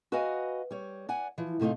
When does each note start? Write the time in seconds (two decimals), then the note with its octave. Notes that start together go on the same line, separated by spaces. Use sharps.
0.12 F#4 B4 D#5 F5 F#5 G#5
0.71 G3 C#5
1.09 D5 F#5 G#5
1.38 E3 F3
1.60 A2 C3 A3 D#4 F4